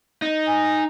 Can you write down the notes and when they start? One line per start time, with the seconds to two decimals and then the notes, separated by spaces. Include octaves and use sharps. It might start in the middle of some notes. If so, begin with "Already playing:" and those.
0.22 D#4
0.47 G#5